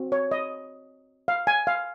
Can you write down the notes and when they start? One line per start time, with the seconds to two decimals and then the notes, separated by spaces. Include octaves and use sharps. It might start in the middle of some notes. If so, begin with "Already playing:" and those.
Already playing: C4 F#4
0.12 C#5
0.31 D#5
1.28 F5
1.47 G#5
1.67 F5